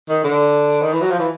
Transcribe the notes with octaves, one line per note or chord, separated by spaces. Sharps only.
D#3
D3
D#3
E3
F#3
F3
E3